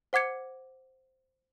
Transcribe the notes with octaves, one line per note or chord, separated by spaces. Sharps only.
C5 F#5 D6 G#6 C#7